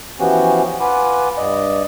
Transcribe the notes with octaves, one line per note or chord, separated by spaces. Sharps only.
E3 F3 B3 C#4 F#4 G4
F4 B4 F#5 G#5 B5 D6
G2 D5 D#5